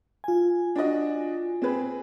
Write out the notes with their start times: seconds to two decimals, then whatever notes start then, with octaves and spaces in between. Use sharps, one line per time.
0.24 F4 G#5
0.76 D4 F#4 D#5
1.62 C4 G#4 B4